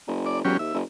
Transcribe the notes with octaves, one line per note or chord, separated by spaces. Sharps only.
F#1
D5
E1 F#3 C#4 G4
D#2 E5
F#1